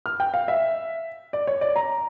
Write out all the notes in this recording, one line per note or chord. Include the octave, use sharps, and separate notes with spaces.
F6
G5
F5
E5
D5
C#5
D5
A#5